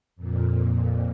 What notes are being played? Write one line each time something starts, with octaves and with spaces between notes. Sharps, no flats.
F2 A#2